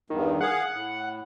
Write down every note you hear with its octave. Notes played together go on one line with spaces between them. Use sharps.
E2 G2 D#3
G#4 F5 F#5
A2